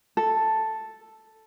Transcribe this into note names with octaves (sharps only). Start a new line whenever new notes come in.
A4